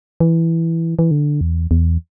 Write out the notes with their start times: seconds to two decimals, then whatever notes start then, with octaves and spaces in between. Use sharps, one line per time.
0.20 E3
0.99 E3
1.11 D3
1.41 E2
1.71 E2